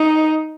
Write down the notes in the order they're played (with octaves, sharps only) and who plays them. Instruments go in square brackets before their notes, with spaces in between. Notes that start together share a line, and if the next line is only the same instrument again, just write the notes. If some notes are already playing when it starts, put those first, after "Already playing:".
Already playing: [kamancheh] D#4